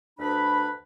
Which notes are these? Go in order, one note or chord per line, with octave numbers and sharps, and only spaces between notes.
D2 D4 B4 B5